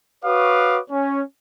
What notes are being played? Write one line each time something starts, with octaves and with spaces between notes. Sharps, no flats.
F#4 B4 C#5 F5 D6 D#6
C#4